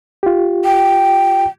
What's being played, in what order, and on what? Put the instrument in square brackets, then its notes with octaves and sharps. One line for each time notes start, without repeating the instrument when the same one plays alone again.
[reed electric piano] F4 G4
[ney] G5